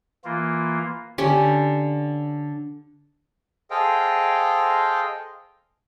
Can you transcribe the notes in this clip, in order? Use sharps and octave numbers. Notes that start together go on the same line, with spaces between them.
E3 A#3 F4
D3 C#4 G4
G#4 A4 C5 D#5 F5 G5